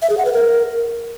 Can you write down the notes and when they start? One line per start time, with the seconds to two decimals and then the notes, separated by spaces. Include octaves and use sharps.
0.02 E5
0.10 G#4
0.18 F#5
0.25 B4
0.33 A#4